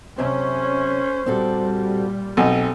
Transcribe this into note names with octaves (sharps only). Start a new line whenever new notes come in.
F#2 C3 C#4 C5
A#2 G3 C4 F#4 A4
B1 C4 A4 D#5 G#5